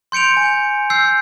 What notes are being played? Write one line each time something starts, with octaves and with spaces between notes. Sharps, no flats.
C6 G6 C#7 D7 F7
G#5
E6 G6 C7